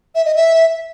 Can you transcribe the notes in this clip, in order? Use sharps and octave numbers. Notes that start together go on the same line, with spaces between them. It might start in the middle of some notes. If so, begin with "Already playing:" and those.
E5
D#5
E5